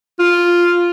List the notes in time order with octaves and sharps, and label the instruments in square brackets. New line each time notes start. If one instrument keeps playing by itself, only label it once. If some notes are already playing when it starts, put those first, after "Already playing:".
[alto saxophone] F4